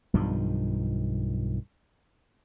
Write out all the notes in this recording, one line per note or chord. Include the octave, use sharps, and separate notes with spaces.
B1 G2 D#3 F3